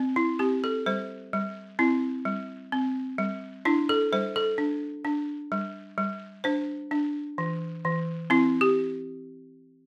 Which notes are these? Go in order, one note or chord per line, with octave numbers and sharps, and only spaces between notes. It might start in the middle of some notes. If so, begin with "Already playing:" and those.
Already playing: C4
E4
C4 G4
A4
G3 C5
G3
C4 E4
G3
C4
G3
D4 E4
A4
G3 C5
A4
D4
D4
G3
G3
D4 C5
D4
E3
E3
C4 E4
G4